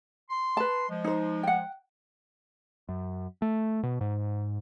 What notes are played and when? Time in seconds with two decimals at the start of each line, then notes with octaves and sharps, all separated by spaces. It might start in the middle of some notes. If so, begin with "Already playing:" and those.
0.30 C6
0.57 B4 A5
0.89 F3 G#3
1.04 D#4 C5
1.43 F#5 G5
2.89 F#2
3.42 A3
3.83 B2
4.01 G#2